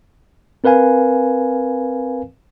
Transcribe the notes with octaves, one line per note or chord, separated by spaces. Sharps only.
C4 A#4 B4 F5 G#5